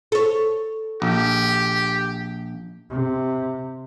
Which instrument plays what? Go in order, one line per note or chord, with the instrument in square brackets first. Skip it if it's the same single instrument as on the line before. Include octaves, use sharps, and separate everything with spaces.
[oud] A4 C#5
[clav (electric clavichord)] A#1 [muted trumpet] G4
[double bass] C3